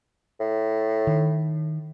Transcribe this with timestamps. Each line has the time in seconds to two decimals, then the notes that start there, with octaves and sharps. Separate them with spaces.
0.40 A2
1.07 D#3